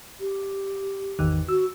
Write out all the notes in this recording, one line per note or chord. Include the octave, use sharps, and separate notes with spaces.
G4
G#1 E2 D#3
F#4 E6